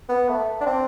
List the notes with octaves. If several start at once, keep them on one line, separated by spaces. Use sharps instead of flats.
B3
A3
D4
C4